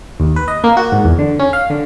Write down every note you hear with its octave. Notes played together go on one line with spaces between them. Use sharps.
D#2
B4
D#5
A#3
F#4
G#2
E2
D3
C#4
F5
D3